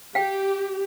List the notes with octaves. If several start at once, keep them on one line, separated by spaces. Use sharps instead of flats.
G4 F5 G5